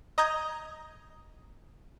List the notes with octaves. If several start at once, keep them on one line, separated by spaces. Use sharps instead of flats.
D#5 A#5 D#6 G6 G#6